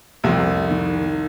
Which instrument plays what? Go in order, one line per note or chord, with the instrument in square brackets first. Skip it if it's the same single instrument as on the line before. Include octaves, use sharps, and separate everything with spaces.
[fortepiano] C2 C3 [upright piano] F2
[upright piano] D#3